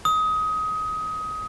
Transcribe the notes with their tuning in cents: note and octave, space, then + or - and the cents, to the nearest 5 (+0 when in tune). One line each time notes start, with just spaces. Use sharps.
D#6 +20